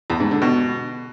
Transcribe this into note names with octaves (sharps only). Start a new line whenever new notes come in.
E2
G#2
D3
B2